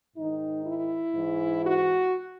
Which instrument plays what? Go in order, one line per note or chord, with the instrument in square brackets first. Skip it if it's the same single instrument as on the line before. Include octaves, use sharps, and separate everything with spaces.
[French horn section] G#2 D#3 D#4
E4
G#2 E3
F#4